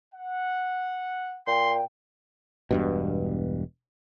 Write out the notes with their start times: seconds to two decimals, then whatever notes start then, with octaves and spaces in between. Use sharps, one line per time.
0.15 F#5
1.47 A#2 G5 C6
2.71 E1 G2 B2